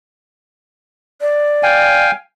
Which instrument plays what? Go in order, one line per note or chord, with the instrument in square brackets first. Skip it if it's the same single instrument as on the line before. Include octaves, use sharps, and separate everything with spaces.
[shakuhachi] D5
[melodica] F5 G5 G#5